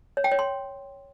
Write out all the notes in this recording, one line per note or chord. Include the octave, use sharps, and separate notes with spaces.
C#5
G5
C#5
C6